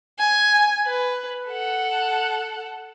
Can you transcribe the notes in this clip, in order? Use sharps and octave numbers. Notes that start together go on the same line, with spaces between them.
G#5
B4
A4 F#5